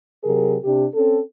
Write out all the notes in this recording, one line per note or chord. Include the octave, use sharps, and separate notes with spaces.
C3 F#3 G4 G#4 A#4
C3 D4 G4
C4 C#4 A4